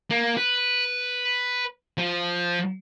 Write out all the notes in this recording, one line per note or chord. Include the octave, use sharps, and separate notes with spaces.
A#3
B4
F3